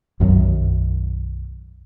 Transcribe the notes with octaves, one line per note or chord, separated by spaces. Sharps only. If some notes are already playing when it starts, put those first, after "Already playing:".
B1 F#2 D#3 F#3